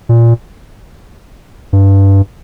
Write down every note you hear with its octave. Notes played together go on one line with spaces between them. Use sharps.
A#2
G2